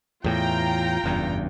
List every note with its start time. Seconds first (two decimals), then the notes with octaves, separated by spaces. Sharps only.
0.24 E2 A2 E3 F4 G5 A#5
1.04 F#1 E2 G2